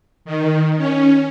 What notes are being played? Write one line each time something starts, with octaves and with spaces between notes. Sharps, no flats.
D#3
C#4